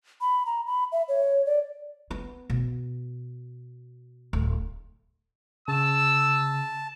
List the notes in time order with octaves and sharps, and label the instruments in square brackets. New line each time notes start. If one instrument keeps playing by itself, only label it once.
[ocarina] B5
A#5
B5
E5
C#5
D5
[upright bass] B3
B2
D1
[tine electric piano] C#3 [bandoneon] A5 [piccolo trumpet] E6